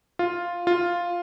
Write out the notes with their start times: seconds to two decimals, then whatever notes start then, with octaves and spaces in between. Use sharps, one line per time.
0.19 F4
0.67 F4